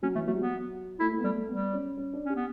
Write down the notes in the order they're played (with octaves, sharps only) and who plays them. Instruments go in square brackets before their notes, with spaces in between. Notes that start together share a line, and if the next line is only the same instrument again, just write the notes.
[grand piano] F#3 [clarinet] C#4
[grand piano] E3 [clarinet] A3
[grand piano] F#3 [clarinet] A3
[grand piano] G3
[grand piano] F#3 [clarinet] B3
[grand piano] A3 [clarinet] E4
[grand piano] A3
B3
[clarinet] G3 [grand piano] A3
[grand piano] A3
[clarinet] G3 [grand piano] B3
[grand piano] C#4
C#4
D4
[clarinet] C#4 [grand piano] G4
[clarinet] B3